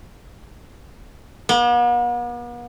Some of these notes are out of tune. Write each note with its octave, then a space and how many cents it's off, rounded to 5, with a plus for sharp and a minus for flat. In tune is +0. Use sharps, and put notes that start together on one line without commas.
B3 -45